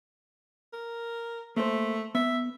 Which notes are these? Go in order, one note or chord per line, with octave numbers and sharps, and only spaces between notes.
A#4
A3 A#3 A#4 C5
B3 E5